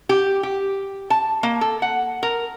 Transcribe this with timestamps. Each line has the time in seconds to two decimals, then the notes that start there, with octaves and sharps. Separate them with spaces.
0.09 G4
0.43 G4
1.10 A5
1.43 A#3
1.61 A4
1.82 F#5
2.23 A#4